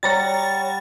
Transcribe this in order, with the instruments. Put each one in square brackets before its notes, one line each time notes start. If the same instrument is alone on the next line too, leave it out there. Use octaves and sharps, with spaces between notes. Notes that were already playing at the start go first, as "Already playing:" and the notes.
[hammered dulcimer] G3 F#5 [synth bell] C#5 A#5 A6